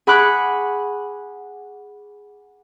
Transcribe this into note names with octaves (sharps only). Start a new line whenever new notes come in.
G#4 F#5 B5 C#6 D6 F#6